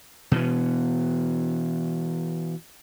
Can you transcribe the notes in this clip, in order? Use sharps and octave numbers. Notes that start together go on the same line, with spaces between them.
B2 E3 B3